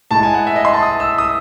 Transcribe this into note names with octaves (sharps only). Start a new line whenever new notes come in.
A2 G#3 A5
G#5
F#5
E5
D#5
C6
A5
D#6
E6
D#6